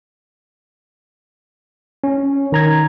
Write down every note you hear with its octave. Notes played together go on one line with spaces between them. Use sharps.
C#4
D#3 A#5 G#6